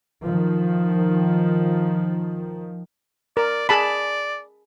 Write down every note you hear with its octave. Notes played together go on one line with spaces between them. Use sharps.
D#3 F3
A#4 D5
G#4 D5 A5 B5